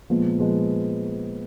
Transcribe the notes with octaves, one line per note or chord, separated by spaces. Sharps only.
A#2 F3 G#3 B3
A#2 F3 G#3 B3